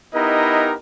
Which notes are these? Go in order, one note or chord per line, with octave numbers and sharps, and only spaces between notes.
B3 D#4 E4 G4 A#4 D#5